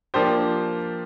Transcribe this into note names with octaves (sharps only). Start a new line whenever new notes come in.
F3 A#3 D4 G4 C5